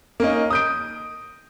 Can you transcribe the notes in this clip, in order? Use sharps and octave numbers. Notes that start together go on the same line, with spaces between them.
A#3 C#4 D#4
D#6 G6 D7